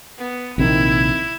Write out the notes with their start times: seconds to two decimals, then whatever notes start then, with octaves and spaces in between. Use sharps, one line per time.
0.18 B3
0.58 A#1 C3 D#3 E4